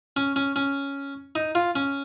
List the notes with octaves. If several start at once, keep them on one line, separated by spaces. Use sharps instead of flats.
C#4
C#4
C#4
D#4
F4
C#4